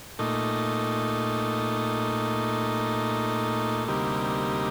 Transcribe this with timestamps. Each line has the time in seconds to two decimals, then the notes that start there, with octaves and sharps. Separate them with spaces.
0.19 A#2 A3 D#4
3.88 D2 C3 G3 A#3 D#4